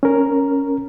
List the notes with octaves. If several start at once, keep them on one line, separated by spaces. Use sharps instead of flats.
C#4 A#4